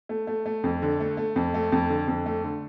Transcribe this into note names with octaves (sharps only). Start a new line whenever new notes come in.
A3
A3
A3
F2
D3
A3
A3
F2
A3
F2
D3
F2
A3
D3